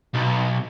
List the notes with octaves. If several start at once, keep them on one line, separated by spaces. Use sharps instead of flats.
B1